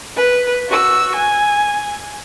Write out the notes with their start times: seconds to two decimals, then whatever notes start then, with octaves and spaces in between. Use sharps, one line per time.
0.16 B4
0.69 F#4 E6
1.16 G#5